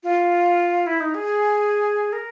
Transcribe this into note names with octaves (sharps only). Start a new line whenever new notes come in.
F4
E4
D#4
G#4
A#4